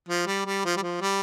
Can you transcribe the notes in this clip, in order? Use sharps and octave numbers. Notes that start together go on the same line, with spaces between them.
F3
G3
G3
F3
G3
F3
G3